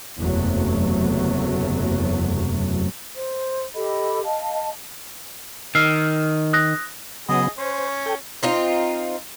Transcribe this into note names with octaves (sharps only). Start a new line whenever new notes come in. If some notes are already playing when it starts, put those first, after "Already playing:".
F#1 E2 C3 F#3 A3
C5
G4 A4 D#5 B5
D#5 F5 A5
D#3 E6 F6 C7
D#6 F#6 A#6
C#3 F#3 B3 G#4 D#5
C#4 C5
A4 G5
C4 D#4 F4